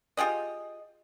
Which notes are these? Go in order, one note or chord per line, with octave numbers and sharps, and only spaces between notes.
F4 G4 G#4 D#5